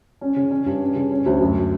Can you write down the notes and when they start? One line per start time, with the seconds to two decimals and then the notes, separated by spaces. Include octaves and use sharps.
0.21 C#4
0.36 C#3
0.51 C#4
0.66 G2
0.80 C#4
0.96 C#3
1.11 C#4
1.26 D2
1.41 F#2